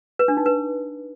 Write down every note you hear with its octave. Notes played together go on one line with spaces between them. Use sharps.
B4
D4
D#4
B4